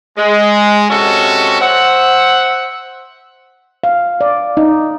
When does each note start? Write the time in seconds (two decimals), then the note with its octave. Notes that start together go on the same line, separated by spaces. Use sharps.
0.17 G#3
0.90 C3 G#3 C#4 F#4 A4
1.61 C5 E5 F#5
3.84 F5
4.21 D5
4.57 D#4